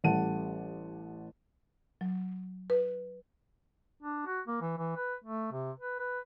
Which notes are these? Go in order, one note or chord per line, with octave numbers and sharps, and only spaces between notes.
A1 G3 A4 F#5 A5 D#7
F#3
B4
D4
F#4
A#3
E3
E3
B4
A3
C3
B4
B4